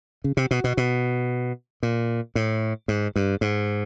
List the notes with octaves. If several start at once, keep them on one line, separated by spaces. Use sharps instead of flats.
C#3
C3
B2
B2
B2
A#2
A2
G#2
G2
G#2